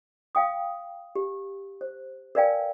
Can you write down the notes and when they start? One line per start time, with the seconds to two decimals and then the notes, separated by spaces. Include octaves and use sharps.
0.35 F5 G5 D#6
1.15 G4
1.81 C5
2.35 A#4 B4 D5 F5 G5 G#5